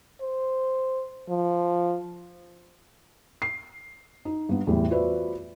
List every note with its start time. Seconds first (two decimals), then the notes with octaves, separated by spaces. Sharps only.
0.21 C5
1.29 F3
3.42 C7
4.25 D#4
4.49 G2 B3
4.67 E2 A2 G3
4.90 F4 F#4 B4 C5 D5 E5